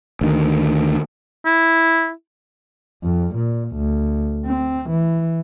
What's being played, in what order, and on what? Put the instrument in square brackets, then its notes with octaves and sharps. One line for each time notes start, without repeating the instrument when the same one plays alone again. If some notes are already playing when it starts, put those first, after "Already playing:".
[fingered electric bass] D2 D#3
[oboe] E4
[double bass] F2
A#2
D2
C4
E3